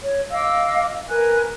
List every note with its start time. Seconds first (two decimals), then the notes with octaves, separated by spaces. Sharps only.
0.01 C#5
0.30 D#5 F5 D6 E6
1.09 A#4 B4 G#5 F#6